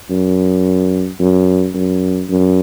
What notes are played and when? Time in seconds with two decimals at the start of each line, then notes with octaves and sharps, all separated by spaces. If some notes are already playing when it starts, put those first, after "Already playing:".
0.11 F#2
1.20 F#2
1.75 F#2
2.30 F#2